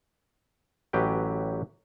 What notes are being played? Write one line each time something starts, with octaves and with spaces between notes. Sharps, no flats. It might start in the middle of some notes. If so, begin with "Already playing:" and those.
A1 F#3 G4 B4 G5